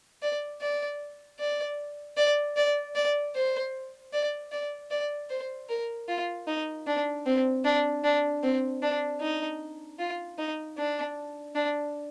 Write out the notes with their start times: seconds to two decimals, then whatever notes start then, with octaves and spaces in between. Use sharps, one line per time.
0.22 D5
0.61 D5
1.39 D5
2.17 D5
2.57 D5
2.96 D5
3.35 C5
4.13 D5
4.52 D5
4.91 D5
5.30 C5
5.69 A#4
6.08 F4
6.47 D#4
6.87 D4
7.26 C4
7.65 D4
8.04 D4
8.43 C4
8.82 D4
9.21 D#4
9.99 F4
10.38 D#4
10.77 D4
11.55 D4